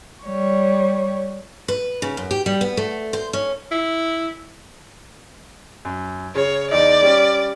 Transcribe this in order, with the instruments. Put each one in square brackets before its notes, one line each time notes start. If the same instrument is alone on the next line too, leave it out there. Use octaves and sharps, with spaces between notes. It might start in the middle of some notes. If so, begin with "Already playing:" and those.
[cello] G3 C#5
[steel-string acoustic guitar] B4
C#3
F#2
G4
G3
B3
A3
C5
C#4
[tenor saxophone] E4
[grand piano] F#2
[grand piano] C#3 [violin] C#5
[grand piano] E2 D#4 [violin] D5
[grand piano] G3 C#4